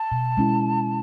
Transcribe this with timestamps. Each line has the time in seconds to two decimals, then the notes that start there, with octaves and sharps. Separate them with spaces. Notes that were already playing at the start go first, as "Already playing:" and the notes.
Already playing: A5
0.12 B2
0.37 G#3 C#4 E4